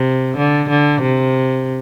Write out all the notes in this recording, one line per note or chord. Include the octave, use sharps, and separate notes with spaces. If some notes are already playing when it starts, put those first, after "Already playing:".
Already playing: C3
D3
D3
C3